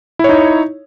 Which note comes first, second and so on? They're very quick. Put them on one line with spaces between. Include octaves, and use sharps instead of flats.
E4 C#5 D#4